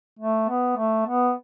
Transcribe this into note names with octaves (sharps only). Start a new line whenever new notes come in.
A3
B3
A3
B3